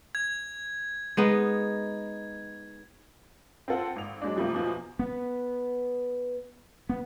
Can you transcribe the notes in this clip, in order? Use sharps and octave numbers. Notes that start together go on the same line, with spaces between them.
G#6
G#3 B3 D#4
C4 F4 A4 F#5
G#1 F7
F#3 G#3 D4
C3 F3 G3 A3 A#3
E2 B2 F3 A#3
B3
B3